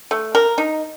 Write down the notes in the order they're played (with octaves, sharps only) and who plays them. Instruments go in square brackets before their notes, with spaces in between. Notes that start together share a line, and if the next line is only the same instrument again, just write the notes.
[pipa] A3
A#4
D#4